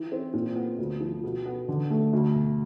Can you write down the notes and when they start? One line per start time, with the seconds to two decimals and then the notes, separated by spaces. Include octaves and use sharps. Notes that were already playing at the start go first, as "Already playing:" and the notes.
Already playing: E3
0.12 C4
0.33 A#2
0.56 B3
0.78 D2
1.00 F3
1.24 B2
1.45 B3
1.68 D3
1.90 A3
2.13 D2
2.34 E1